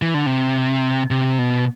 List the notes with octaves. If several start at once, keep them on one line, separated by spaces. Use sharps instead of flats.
E3
D3
C3
C3
B2